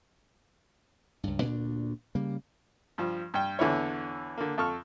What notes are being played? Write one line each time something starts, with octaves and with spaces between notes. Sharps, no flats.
C#2 G2
D2 A#2 A3 D4
C#3 G3 A#3
G2 F3
G2 G5
E2 D3 E3 E4 C#5
D3 A#3
F2 A4 C#6 F6